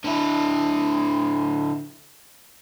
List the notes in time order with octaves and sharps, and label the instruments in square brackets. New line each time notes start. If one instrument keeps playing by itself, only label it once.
[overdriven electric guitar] D3 E4